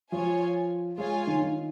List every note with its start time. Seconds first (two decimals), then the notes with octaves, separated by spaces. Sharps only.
0.12 F3 F4 C#5 G#5
0.98 G#3 F4 C#5 F5 G#5
1.27 D#3
1.41 D#3